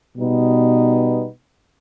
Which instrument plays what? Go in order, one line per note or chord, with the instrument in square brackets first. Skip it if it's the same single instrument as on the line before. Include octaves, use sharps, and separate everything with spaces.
[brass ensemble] B2 G3 B3 D#4